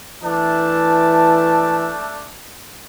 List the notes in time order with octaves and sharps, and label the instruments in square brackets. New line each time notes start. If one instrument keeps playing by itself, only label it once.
[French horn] E3 [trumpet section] A3 D4 A5